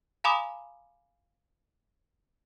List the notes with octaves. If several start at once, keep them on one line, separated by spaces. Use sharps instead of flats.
F5 G#5 A#5 B5 D6 D#6